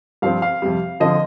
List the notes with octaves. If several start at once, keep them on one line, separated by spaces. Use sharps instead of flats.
G2 F3 C4 F5
F5
F2 C3 G3
D3 F3 C4 F4 D#5